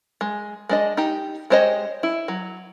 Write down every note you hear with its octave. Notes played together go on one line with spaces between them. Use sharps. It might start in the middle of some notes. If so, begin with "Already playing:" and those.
G#3
G#3 D4 D#5
D#4 G4
G#3 G4 C5 C#5 D#5
E4
F#3